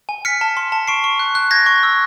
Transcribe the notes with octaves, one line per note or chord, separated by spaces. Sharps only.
G#5
F6 B6 C#7
A5
C6
A5
C#6 C7 D7
C#6
F#6
F#6
G6 G#6 A#6
C#6
E6